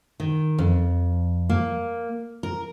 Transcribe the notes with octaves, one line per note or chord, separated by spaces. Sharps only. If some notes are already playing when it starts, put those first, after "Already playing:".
D#3
F2
A#3
A#4